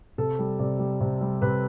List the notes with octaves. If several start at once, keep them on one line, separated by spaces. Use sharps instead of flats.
C3 A4
G3
C3 D5
G3
C3 C5
G3
C3 B4